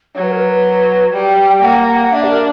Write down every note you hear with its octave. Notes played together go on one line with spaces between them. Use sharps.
F#3 C#5
B4
A#4
B4
G3 G5
G5
A#3 F#5
F#5
F#5
D4 E5
G4
A#4